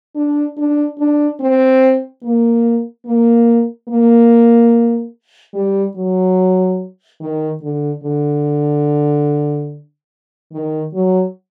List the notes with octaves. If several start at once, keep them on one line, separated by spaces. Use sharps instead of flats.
D4
D4
D4
C4
A#3
A#3
A#3
G3
F#3
D#3
D3
D3
D#3
F#3